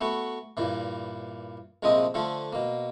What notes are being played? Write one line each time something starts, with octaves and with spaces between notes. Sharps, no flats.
A3 B3 F#4
G2 A#2 E3
A#1 C3 F3 G#3 C4 D#5
D3 F3 A3 F4
B2 A#3